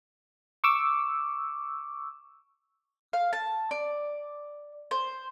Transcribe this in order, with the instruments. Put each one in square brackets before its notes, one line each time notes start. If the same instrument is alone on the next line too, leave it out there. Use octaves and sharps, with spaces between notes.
[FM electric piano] C#6 D6 E6
[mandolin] F5
A5
D5
C5